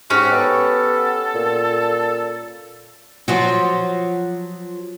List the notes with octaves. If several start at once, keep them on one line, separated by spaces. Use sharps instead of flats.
G#2 C#4 F#4 G4 C#6
B3 A4
A#2
F3 F#3 F#4